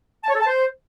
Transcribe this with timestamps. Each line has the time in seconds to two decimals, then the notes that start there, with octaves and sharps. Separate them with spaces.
0.24 A5
0.29 C#5
0.35 A4
0.41 A5
0.47 C5